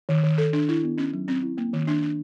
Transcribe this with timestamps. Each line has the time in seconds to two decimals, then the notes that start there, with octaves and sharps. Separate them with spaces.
0.09 D#3
0.23 D#3
0.38 A4
0.53 D4
0.69 E4
0.83 B3
0.98 C#4
1.13 F#3
1.28 C4
1.42 E4
1.58 A#3
1.73 D#3
1.87 D4
2.02 D4